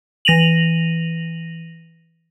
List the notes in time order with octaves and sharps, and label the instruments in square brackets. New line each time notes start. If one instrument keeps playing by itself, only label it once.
[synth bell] E3 A#6 D#7 F7 F#7